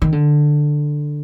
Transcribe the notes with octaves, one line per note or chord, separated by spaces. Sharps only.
D#3
D3